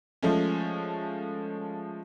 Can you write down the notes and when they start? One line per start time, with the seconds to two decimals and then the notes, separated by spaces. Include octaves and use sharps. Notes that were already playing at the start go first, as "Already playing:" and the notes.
0.23 F3 G#3 A3 C#4